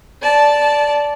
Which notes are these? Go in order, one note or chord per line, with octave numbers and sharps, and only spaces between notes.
D5 A5